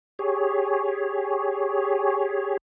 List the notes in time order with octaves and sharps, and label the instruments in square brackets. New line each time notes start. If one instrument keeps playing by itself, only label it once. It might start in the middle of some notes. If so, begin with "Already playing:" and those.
[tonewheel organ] G4 G#4 C#5